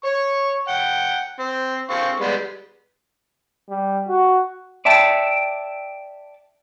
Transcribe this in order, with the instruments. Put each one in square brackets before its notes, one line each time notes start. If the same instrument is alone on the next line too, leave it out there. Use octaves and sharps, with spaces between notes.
[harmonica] C#5 C#6
F#5 G5
C4
C4 F5 C#6
G3 G#3 B3
[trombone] G3
F#4
[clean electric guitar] D5 E5 G5 A5